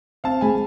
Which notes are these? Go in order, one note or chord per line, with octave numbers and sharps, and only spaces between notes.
C4 F5 A5
G#3 G#5 B5